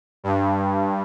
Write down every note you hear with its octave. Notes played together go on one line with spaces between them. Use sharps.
G2